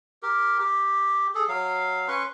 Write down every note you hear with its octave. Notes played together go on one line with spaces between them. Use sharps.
G4 A#4
G4
G#4 A4
F#3 F5
C#4 B4 C6 C#6